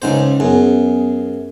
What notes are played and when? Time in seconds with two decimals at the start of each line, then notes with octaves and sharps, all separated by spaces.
0.02 C#2 G#2 C5
0.40 F#2 B3 G#4